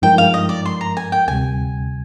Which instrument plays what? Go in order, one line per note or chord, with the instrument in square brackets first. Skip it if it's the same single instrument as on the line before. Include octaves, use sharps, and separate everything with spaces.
[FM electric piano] G2 F3 G#3 D#4 A#4 [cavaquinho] G5
[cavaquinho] F5
D#5
D5
C6
A#5
G#5
G5
[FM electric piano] D2 C3 G3 [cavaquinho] G#5